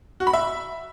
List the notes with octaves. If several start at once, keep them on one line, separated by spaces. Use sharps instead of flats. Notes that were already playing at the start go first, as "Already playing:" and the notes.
F#4
B5
E5